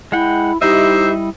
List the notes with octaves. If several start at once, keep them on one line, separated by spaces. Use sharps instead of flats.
G#3 E4 F#5 G5
G3 D#4 E4 G4 C5 D#5 E5